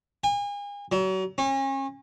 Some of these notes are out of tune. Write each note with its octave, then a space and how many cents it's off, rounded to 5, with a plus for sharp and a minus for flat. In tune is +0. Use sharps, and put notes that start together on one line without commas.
G#5 -40
F#3 +35
C#4 -35